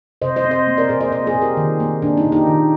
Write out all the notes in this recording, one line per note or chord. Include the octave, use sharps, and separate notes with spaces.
C3 C5 D#5
C5 D#5
C4
C5 D#5
A#3
A#4 D5
A#2 G#4 C5
C5 D#5
A#2 C5 D#5
G#4 C5
A#2
G4 A#4
D#3
A#3
A#2 D4
D#4
A#2
D#4 G4
D#3